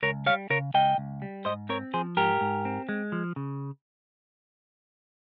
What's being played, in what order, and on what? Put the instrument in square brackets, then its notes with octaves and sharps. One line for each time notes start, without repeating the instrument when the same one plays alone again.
[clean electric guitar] C#2 A#4 C#5
G3 C#5 F5
C#3 A#4 C#5
C#2 D#5 G5
C#2
G3
G#2 C5 D#5
C4 A#4 C#5
F3 G#4 C5
G#2 G4 A#4
G#2
C4
G#3
F3
C#3